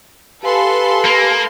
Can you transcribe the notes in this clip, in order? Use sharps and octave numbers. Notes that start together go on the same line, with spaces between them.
G4 A4 B4 F5 G#5 C6
A#3